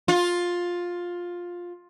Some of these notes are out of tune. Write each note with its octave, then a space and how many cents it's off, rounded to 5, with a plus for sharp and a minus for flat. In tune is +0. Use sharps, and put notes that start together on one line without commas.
F4 +10